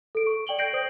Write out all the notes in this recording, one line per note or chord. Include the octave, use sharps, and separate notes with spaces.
A4 D7
C#6
D5 G5 F#7 G7
G6 A#6 C7 D7 F#7
C5 D#6